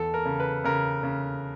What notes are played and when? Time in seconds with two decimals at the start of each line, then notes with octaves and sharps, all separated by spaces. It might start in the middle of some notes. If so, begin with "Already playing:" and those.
Already playing: E2 A4
0.14 A#4
0.25 C#3
0.40 B4
0.64 C#3 A#4
1.03 C#3